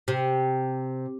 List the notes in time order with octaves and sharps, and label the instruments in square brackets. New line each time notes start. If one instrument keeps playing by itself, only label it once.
[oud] C3